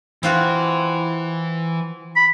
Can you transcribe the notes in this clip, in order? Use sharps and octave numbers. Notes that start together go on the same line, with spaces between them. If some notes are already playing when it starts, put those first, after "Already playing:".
E3 C4 F4 F#4
B5